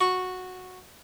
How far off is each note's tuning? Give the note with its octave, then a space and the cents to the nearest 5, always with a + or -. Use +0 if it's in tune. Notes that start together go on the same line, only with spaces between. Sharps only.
F#4 -10 C#6 -5